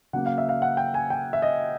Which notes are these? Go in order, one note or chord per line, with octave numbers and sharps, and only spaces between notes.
C#3 F#3 A#3 F#5
F5
E5
F5
F#5
G5
G#5
G5
E5
D#5